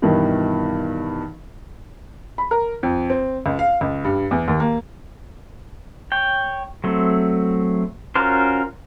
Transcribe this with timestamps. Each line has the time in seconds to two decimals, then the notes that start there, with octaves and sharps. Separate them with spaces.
0.02 G2 B2 D#3 E3
2.38 B5
2.51 A#4
2.83 F2
3.10 C4
3.46 C#2
3.59 F5
3.81 C#2
4.05 G2
4.31 E2
4.48 D#2
4.60 A#3
6.12 C#5 G5
6.84 F#3 A3 C4
8.15 C#4 F4 F#4 A#4 C5